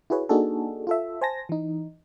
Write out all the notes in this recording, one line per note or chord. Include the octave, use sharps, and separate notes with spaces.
E4 F#4 G#4 B4 C#5
A#3 D4 D#4 F#4 G#4 A4
F4 A4 E5
C5 G#5 A5 A#6
E3 D#4